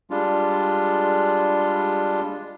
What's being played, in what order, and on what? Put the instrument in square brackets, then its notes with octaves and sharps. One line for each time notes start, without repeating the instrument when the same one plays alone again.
[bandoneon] G3 G#3 D4 F4